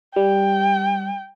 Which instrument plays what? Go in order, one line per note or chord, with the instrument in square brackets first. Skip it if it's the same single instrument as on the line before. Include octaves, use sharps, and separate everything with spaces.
[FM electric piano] G3 [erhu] G5